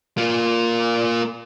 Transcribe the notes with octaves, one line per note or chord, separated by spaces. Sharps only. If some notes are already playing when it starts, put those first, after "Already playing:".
A#3 F4